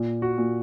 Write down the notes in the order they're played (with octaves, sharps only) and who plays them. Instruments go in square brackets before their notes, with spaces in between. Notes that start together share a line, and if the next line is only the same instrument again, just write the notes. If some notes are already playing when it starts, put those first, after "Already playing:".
Already playing: [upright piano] A#2
[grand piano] F#4
[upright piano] A#2